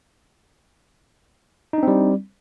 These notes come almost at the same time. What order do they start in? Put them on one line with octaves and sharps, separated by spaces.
D#4 D4 C4 G3